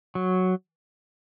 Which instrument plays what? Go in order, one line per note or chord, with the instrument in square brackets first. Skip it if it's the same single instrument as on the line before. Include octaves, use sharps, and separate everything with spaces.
[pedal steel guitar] F#3